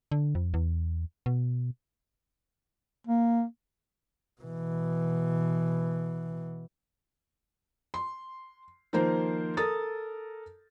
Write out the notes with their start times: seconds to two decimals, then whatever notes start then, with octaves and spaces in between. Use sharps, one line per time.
0.12 D3
0.35 F2
0.54 E2
1.26 B2
3.07 A#3
4.41 B2 E3
7.94 C6
8.93 D#3 F3 A#3 A#4 C5
9.57 A4 A#4 D#6 A6